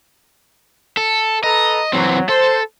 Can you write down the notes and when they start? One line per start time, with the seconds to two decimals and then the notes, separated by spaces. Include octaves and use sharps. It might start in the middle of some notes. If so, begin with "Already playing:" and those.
0.97 A4
1.44 A4 B4 D#5 A#5
1.93 E3 F#3 C4
2.29 A4 C5